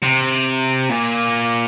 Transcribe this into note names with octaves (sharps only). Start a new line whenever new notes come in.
C3
A#2